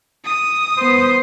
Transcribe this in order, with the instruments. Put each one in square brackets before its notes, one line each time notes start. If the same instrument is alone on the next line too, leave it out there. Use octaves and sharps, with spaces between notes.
[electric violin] D#6
[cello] B3 C5